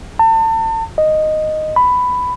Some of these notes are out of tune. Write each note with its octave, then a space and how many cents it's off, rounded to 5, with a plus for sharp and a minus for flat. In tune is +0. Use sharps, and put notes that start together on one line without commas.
A5 +35
D#5 -5
B5 +10